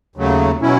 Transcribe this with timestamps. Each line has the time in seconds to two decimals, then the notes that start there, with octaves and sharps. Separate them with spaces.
0.16 D#2 C#3 F#3 A3
0.60 B2 F#3 C#4 E4